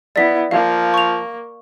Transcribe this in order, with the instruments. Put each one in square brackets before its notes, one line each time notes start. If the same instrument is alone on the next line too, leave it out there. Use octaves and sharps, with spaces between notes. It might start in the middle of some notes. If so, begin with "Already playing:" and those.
[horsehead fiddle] B3 E4 [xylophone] D5 B6
[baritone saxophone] F3 [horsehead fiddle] A#3 [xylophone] F5
[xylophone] C#6 F7